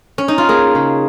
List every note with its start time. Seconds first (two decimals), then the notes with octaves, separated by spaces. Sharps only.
0.18 C#4
0.28 D#4
0.38 F4
0.49 A#3 G#4
0.75 C#3